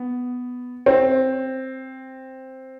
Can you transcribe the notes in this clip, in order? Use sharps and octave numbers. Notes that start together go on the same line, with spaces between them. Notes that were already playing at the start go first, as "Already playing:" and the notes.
Already playing: B3
C4